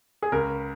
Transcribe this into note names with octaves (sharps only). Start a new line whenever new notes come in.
G#4
C#2 A#4